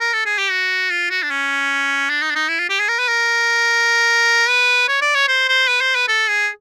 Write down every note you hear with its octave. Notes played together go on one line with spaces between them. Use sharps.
A#4
A4
G#4
G4
F#4
F4
F#4
D4
C#4
D4
D#4
D4
D#4
E4
F4
G4
G#4
A#4
B4
A#4
B4
C#5
D5
C#5
C5
C5
B4
C5
B4
A4
G#4